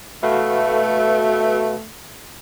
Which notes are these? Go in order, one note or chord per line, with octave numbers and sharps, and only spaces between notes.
B2 A3 F#4 B4 F5